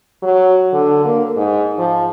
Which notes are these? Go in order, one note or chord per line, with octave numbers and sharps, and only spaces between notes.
F#3
D3
A#3
G#2
F3